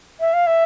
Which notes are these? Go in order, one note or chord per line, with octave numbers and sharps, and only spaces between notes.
E5
F5
E5